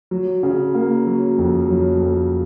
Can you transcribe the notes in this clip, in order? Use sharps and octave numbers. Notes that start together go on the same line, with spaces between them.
F#3
C#3
A#3
F#3
F2
F#3
F2